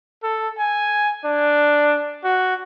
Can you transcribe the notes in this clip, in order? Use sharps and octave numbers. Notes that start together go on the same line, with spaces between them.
A4
G#5
D4
F#4